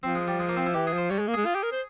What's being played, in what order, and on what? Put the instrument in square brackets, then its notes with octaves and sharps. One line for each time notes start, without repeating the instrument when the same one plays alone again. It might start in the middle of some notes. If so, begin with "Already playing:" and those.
[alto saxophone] F3 [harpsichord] C4
[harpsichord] G#3
G3
G#3
A#3
C4
E4
[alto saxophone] E3 [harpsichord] G4
[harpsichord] G#4
[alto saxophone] F3 [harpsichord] C5
[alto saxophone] G3 [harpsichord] C#5
[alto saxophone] G#3
A#3
[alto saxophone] G#3 [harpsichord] G#4
[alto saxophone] F4
G4
A#4
C5